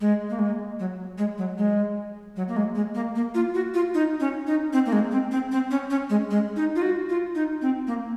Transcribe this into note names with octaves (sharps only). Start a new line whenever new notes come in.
G#3
A#3
G#3
F#3
G#3
F#3
G#3
F#3
A#3
G#3
G#3
A#3
A#3
F4
F#4
F4
D#4
C#4
D#4
C4
A#3
G#3
C4
C4
C4
C#4
C#4
G#3
G#3
D#4
F4
F#4
F4
D#4
C4
A#3